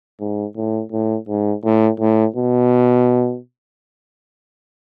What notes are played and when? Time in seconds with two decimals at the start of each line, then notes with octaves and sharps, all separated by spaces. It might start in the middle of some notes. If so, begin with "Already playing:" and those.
0.20 G#2
0.56 A2
0.92 A2
1.28 G#2
1.64 A2
2.00 A2
2.36 B2